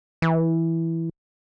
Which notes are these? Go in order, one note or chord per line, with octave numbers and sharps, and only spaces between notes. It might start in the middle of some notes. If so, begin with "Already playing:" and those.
E3